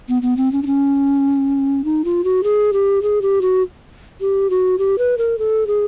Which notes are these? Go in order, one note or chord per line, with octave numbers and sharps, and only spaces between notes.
B3
B3
C4
C#4
D4
C#4
D#4
F4
F#4
G#4
G4
G#4
G4
F#4
G4
F#4
G4
B4
A#4
A4
G#4